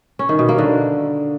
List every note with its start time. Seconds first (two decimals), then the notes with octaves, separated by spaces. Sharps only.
0.19 C#4
0.29 D#3
0.39 B2
0.49 A#3
0.58 D3